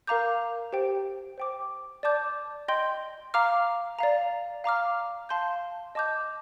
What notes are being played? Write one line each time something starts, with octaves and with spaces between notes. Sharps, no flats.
A#4 F5 A#5 D6 G6
G4 C5 G5
C5 G5 D6
D5 A5 D6 G6
D#5 G5 C6 G6
F5 A#5 D6 F6
D5 F5 A#5
F5 A#5 D6 F6
F5 A5 C6 G6
D#5 A5 D6 G6